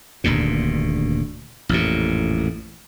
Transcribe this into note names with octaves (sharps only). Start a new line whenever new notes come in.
D#1 D2 G2 A#2
A1 F2 A#2